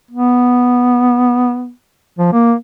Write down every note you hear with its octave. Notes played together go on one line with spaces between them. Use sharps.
B3
F3
A#3